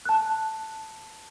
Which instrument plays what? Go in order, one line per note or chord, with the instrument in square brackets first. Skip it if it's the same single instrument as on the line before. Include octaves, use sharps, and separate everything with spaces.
[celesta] A5 F#6